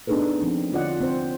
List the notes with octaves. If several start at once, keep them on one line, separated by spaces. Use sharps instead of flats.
B3 D4 D#4 G#4 A4 B4
F3 C4
D3 C#4 F4 D5 D#5 F#5
C4 C5